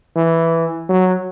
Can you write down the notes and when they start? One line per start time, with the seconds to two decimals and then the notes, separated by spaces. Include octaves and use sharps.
0.16 E3
0.89 F#3